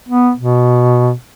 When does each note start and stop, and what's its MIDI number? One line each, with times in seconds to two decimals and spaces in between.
0.08 0.31 59
0.37 1.12 47